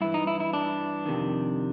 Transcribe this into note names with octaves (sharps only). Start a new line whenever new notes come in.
G2 E3 E4
D#4
E4
E4
D4
F2 C3 D#3